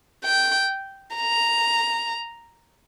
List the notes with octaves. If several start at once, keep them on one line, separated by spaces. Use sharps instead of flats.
G5
A#5